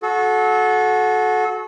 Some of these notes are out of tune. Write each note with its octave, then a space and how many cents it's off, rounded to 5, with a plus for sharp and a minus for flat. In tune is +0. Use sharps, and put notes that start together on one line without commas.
F#4 -15 A4 -30